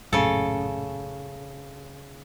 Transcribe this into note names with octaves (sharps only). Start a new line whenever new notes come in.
A#1 F#2 A2 C#3 A4